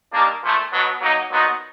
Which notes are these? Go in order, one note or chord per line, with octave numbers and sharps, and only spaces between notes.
D#3 G3 A#3 D4
A#2 F3 A3
B2 F#3 B3
F#3 A#3 D#4
A#2 F#3 B3 D#4 F#4